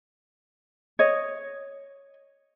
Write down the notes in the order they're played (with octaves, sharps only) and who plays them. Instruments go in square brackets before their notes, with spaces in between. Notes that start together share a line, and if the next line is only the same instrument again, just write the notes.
[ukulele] C#5 D#5